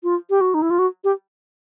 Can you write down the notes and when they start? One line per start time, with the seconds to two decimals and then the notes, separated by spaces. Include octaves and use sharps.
0.04 F4
0.30 G4
0.41 F#4
0.54 D#4
0.62 E4
0.70 F4
0.79 F#4
1.04 G4